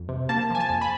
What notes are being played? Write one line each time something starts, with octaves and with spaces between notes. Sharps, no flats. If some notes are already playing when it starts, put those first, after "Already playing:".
Already playing: F2
C3
A#3 A5
F3 G#5
A5
F2
B5